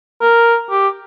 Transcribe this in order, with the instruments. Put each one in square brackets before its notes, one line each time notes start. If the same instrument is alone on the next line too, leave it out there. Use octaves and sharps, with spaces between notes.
[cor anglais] A#4
G4